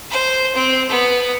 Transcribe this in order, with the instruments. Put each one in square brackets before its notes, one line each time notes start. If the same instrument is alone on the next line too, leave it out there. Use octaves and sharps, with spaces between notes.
[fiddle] C5
C4
B3